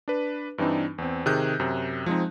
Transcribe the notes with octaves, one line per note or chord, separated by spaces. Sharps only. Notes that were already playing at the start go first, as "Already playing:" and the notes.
D4 B4
G2 E3 C4 D4 D#4
E2 C4
C3 D#3 G#4 F#6 G6
F#2 C3
F3 G#3 C4 D#4